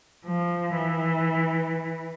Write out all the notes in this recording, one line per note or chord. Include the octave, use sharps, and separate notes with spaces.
F3
E3